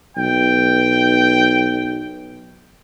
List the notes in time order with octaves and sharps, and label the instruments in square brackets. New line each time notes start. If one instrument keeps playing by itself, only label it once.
[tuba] B1 [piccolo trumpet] G5